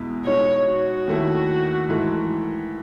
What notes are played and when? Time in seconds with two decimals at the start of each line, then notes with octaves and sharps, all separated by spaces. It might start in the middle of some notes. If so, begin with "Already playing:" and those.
Already playing: E2 B2 G#3 B3 E4
0.25 B2 G#3 D#4 C#5
0.66 F#4
1.07 D#2 D#3 A3 E4
1.89 G#2 E3 A3